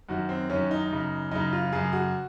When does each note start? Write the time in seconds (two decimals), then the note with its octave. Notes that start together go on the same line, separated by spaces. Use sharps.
0.09 F#2 D#3 F#4
0.29 C4
0.50 F#2 D#3 C#4
0.71 D#4
0.91 F#2 C#3
1.31 F#2 C#3 D#4
1.53 F4
1.73 F#2 C#3 G#4
1.93 F#4